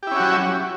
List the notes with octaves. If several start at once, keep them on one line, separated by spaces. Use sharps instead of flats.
F#3 C#4 E4 F#4 G4